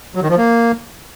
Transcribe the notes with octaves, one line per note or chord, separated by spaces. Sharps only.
F#3
D#3
F3
A#3